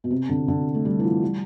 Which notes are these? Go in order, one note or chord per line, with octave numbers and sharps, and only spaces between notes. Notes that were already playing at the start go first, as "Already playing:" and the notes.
B2
C3
D3
D3
A3
G3
E3
F3
G3